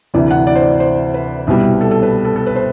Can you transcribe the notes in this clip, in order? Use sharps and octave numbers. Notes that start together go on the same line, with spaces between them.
D2 C3 E3 D5
F#5
D5
C5
D5
C5
B4
C2 B2 G3
A4
A4
B4
A4
A4
B4
C5